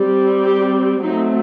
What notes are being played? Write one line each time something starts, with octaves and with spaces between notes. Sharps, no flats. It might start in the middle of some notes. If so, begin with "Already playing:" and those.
Already playing: G3 C4
G4
F#3 A3 C4 D#4